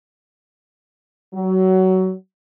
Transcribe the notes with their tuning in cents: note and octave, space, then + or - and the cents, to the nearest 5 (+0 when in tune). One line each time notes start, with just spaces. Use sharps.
F#3 +20